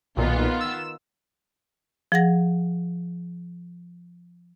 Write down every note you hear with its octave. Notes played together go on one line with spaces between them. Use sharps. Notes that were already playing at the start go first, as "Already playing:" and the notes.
B1 A#2 D#3 B3 F4
E6
F3 G#4 F#5 A#6